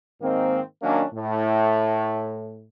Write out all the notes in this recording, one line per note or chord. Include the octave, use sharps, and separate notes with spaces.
G#2 D#3 A#3 C4
D#3 F#3 A#3 C#4 D4
A2